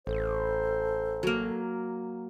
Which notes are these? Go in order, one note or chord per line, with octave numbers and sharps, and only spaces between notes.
A1 A4 C5
F#3 A#3